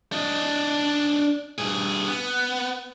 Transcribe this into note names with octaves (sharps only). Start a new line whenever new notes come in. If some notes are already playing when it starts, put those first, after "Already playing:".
D4 D#5
G2 G#4
B3